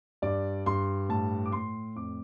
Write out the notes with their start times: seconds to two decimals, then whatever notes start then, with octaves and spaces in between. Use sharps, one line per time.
0.22 G2 D5
0.66 G2 C6
1.09 A2 A5
1.46 D6
1.52 A2 C6
1.95 F2 D6